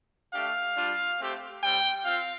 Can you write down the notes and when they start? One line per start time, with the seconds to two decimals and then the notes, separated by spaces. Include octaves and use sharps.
0.34 A3 D4 G4 F5
0.77 G3 D4 F4
1.20 A3 C4 G4
1.63 G3 C4 G4 G5
2.05 C4 F4 F5